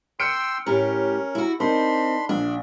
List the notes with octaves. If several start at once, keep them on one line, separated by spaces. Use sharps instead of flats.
G5 C6 E6 F6 C#7 D7
A2 C#4 G4 A#4
E4 F#4
C4 D4 D#4 A#4 B5 C6
A#1 D4